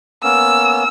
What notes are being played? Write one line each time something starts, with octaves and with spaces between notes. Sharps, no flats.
A#3 B3 C#4 E6